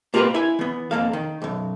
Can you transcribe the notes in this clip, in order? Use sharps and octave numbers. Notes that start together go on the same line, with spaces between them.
A#3 F4 G4 G#4 A#4 B4
E4 G#5
E3 B3
F2 C3 A#3 A4 F5
D#3
B1 F#2